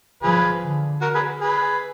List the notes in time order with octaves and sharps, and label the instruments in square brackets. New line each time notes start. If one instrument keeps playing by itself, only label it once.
[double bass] F3 [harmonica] G#4 B4
[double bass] D3
[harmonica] F#4 A#4
G#4 B4
G#4 B4